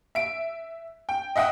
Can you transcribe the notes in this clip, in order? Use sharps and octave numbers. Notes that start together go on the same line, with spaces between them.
E5 D7
G5
D#5 E5 F#5 G5 D#6